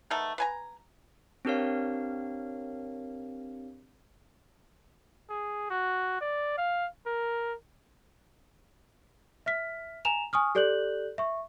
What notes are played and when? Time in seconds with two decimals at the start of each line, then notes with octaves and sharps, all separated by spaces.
0.11 A3 B3 D#4 A#4
0.38 B4 G#5 A#5
1.45 C4 D4 G4 A#4 C#5 F5
5.30 G#4
5.71 F#4
6.21 D5
6.58 F5
7.07 A#4
9.46 E5 F6 B6
10.05 G#5 A#5 E7 F7
10.33 G#5 C#6 D#6 F6
10.55 G4 A4 D5 F#6 G6 F#7
11.18 E5 C#6